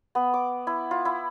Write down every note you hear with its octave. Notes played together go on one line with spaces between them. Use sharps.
B3
D6
E4
F4
E4